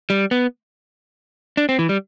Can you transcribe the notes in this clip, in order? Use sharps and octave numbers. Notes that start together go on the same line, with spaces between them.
G3
B3
D4
C4
E3
G3